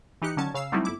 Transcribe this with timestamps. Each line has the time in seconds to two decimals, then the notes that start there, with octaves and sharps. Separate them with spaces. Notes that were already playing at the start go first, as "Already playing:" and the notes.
0.22 E3 D#4 G4 F#6 C#7
0.37 D3 D#3 F#3 C#4 A5 G#6
0.54 C#3 F5 E6 C7
0.72 F#3 G3 A3 C4 D#4 E4
0.85 G1 E4 D6